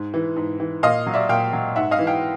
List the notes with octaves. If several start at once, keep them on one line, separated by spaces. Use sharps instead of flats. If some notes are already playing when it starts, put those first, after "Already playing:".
Already playing: G#2
E3
G#2
E3
A#2 D#5 F5
F#3
D5 E5
A#2 F5 G5
F#3
G#2 E5 F#5
D#5 F5
E3
F5 G5